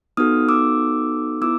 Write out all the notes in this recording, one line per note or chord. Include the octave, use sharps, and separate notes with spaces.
B3 D#4 F#4 A4 D#6 F6
D6 E6
B3 E4 D6 E6